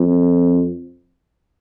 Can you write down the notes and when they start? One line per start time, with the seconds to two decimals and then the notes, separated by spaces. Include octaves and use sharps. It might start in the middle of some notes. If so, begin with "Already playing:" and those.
Already playing: F2